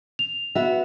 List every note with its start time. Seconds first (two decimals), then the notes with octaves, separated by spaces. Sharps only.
0.19 F7
0.55 B3 F#4 E5